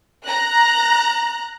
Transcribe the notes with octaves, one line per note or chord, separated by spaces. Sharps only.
A#5 F#6